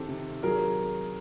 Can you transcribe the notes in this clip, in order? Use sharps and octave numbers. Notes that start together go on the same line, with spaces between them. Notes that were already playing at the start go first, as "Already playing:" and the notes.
Already playing: D#3 C4 G4 A4
C3
F#3 G#4 A#4